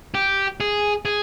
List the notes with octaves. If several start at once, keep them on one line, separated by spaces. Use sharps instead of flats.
G4
G#4
G#4